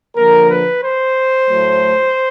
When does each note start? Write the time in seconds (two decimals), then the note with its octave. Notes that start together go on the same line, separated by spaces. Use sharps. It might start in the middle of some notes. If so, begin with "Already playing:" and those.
0.17 D3 F3 A#3 A#4
0.50 B4
0.83 C5
1.50 A2 F#3 A3